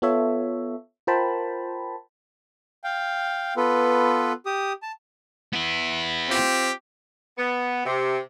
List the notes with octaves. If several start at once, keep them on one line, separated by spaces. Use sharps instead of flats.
B3 F4 A4 C#5 E5
F4 A#4 C5 G5 A5 B5
F5 G5
B3 F4 A4 B4
G4 D#6
A5
B3 E4
C4 F4 G4
B3
C3